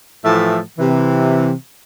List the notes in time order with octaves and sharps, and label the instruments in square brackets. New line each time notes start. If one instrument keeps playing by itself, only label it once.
[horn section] A2 E3 F3 A3 E5 A5
C3 E3